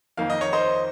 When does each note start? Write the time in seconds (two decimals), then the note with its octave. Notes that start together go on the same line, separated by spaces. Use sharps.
0.17 F2 D#3 A#3 D#4 F5
0.30 D#5
0.41 C#5
0.53 C5 D#5